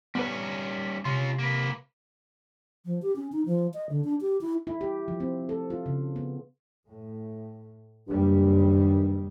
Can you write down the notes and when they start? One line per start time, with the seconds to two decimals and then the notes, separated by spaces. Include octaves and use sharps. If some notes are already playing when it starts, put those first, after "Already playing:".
0.15 G3 B3 C#4 B4
1.05 C3 C#4 F4 C6
1.39 A#3 B4
2.86 F3
3.02 G4
3.16 C#4
3.32 D#4
3.46 F3
3.74 D#5
3.89 D3
4.04 D4
4.21 G4
4.41 E4
4.67 E4
4.81 G4
5.08 F3
5.20 C4
5.49 A4
5.70 F4
5.86 C#3
6.16 B3
6.87 A2
8.07 F#1 G2 D#3 G3